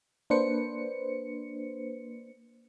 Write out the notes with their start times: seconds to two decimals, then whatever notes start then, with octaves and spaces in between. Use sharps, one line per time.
0.30 A#3 D4 B4 C5 C#7